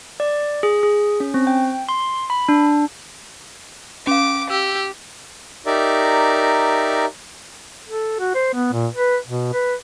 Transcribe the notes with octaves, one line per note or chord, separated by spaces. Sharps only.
D5
G#4
G#4
C#4
C4
G5
C6
B5
D4
C#4 F5 D6
G4 E6
D#4 G4 A#4 D5 E5
A4
F#4
C5
B3
A#2
B4
B2
B4